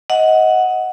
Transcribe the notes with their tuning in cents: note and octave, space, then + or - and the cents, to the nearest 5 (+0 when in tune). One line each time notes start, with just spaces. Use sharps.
D#5 +25 F#5 +0